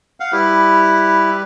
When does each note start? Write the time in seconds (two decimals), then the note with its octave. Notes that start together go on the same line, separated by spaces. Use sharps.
0.20 F5 F#5
0.32 G3 E4 G4 B4